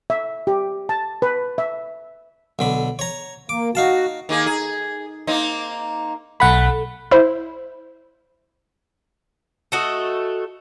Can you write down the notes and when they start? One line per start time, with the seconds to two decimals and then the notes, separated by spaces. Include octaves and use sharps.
0.10 E5
0.47 G4
0.89 A5
1.22 B4
1.58 E5
2.59 B1 D3 B5
2.99 C#5 A#5
3.49 A#3 D6
3.75 D#4 F#4 F5 A5
4.29 D#3 A#3 G#4
4.46 G#4
5.27 A#3 C4 D#4
6.40 B1 A3 F#5 B5
7.11 E4 C5
9.72 A3 F#4 D#5